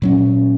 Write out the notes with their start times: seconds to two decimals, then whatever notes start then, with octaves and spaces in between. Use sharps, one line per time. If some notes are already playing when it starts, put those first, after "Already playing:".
0.02 A#2 F#3 C#4